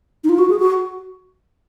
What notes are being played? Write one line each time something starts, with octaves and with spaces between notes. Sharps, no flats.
D#4
F4
F#4
G#4
F#4